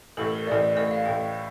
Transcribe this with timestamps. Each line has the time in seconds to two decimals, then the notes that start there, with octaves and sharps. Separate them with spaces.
0.17 A1 A2 A3 A4
0.32 A#4
0.47 A1 A2 A3 D5
0.76 A1 A2 A3 D#5
0.91 F5
1.06 A1 A2 A3 G5